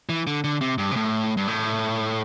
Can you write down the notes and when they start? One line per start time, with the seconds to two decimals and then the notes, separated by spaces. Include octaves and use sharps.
0.09 E3
0.27 D3
0.44 D3
0.61 C3
0.78 G2
0.91 C3
0.96 A2
1.37 G2
1.48 A2